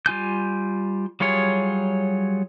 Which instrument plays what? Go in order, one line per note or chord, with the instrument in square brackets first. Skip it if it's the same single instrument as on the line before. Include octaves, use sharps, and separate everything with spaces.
[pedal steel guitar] G3 F4 G#5 G6
F#3 G3 F4 G#4 C#5